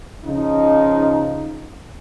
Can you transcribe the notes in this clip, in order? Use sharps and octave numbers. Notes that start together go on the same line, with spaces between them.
C#3 F3 D#4